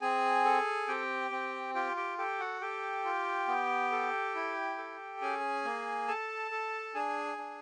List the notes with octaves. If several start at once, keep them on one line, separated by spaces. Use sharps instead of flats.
C4 G#4 G#5
A4
C4 G4 G5
C4
F4 G4 G5
G4 G5
G4 A4 G5
F#4 F#5
G4 A4 G5
F4
B3
A4
E4
A4
C#4 G#4 G#5
A#3
A4 A5
A4
D4 G#4 G#5
D4